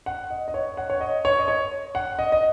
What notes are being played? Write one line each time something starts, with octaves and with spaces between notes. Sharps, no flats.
F#5
D#5
D#5
C#5
F#5
C#5
D#5
C#5
D#5
C#5
F#5
D#5
D#5